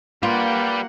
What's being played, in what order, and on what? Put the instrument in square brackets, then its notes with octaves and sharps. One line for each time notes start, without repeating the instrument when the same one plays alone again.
[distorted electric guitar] G3 D5 [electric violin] A#3 F#5 [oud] F4 [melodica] B4 G5 B5